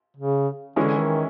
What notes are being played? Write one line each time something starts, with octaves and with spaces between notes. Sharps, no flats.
C#3
D3 E3 G#3 C#4 E4
D#3